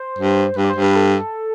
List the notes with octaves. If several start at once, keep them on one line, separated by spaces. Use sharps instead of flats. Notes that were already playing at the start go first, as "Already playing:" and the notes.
Already playing: C5
G2
G2 B4
D5
C5
G2
B4
A4